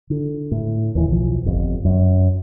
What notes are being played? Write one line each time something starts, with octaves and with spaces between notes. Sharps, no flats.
D3
A2
D#2 E3
B1 F3
G1 F2
F#2